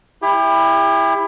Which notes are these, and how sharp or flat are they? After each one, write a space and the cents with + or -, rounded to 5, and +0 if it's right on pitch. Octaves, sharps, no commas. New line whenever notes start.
E4 +0 G4 +35